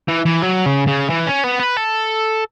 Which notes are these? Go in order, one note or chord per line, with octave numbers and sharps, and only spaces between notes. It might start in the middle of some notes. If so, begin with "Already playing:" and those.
E3
E3
F#3
C#3
C#3
E3
C#4
B3
B4
A4